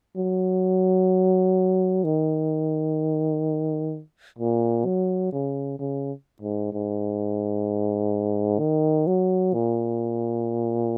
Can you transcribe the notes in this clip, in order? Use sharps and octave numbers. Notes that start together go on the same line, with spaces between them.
F#3
D#3
A#2
F#3
C#3
C#3
G#2
G#2
D#3
F#3
A#2